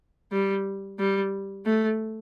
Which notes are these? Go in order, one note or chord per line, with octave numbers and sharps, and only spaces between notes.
G3
G3
A3